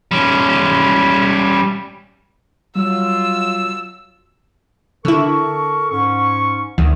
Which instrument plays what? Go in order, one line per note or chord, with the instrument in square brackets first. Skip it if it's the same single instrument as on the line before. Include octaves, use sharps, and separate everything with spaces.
[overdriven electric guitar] G3 C#4
[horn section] F#3 F4 [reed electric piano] G3 [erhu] E6
[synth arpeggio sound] D3 E4 [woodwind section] A4 A#4 C#6
[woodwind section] G#2 C#4 C#6
[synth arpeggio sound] D2 D#3